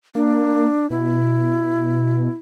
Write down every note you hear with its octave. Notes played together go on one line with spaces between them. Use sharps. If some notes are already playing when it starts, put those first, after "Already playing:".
A#3 D4
B2 E4